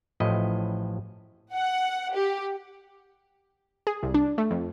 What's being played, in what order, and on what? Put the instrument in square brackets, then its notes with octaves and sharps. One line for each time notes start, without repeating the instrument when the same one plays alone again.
[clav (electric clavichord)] A1 A2 F3 E4 D#5
[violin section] F#5
G4
[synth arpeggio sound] G#4
C2
D4
A3
F2